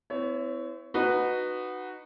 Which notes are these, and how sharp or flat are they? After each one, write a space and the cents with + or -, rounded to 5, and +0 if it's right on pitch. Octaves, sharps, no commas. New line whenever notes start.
C4 -40 E4 +0 C#5 +15
D#4 -20 F#4 +0 B4 +0